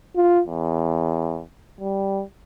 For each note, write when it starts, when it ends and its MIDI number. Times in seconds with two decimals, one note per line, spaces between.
0.16 0.41 65
0.46 1.41 40
1.80 2.22 55